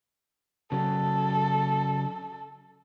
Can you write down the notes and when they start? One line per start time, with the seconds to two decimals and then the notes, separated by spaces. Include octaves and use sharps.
0.72 C#3 F#3 A4